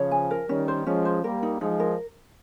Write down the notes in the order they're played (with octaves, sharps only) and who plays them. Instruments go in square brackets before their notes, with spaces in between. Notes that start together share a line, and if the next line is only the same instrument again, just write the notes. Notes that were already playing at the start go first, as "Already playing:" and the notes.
Already playing: [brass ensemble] C#3 F3 [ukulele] C#5
[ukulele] G#5
A#4
[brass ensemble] D#3 G3 [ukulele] C#4
[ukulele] C5
[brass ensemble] F3 G#3 [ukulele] C#4
[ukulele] C5
[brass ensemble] G3 A#3 [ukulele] A#4
[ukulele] D#4
[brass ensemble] F3 G#3 [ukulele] D#4
[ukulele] A#4